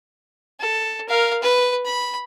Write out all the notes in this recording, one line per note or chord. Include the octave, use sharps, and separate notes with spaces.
A4
A#4 F5
B4
B5